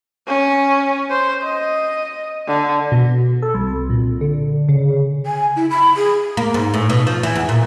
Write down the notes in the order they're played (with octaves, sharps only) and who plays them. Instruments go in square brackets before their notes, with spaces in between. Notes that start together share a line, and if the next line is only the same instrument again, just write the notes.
[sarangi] C#4
C5
D#5
D3
[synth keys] B2
A4
C2
A#2
D3
C#3
[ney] G#5
E4
B5
G#4
[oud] A#3
G#2
A2
B2
F3
E3
E2
A#2